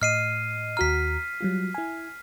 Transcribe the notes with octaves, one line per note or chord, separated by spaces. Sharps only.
A2 D#5 F6 C7 D#7
D#2 F#4 A#5 F6 B6
F#3 G3 F4
E4 G#5